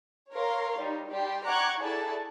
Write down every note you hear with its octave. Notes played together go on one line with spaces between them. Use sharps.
A#4 C#5 F5 C6
G3 D#4
G3 G4 C6
F#5 A#5 C#6 D6 F#6 G#6
E4 G#4 A4 D5 A5